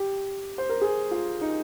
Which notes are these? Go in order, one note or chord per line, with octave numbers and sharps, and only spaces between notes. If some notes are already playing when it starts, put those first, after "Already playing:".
Already playing: G4
C5
A#4
G#4
F4
D#4